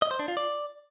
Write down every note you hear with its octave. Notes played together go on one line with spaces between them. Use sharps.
D#5
C5
D4
F4
D5